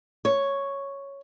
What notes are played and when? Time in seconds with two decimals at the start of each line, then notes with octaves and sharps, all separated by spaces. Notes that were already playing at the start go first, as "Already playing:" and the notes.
0.25 C#5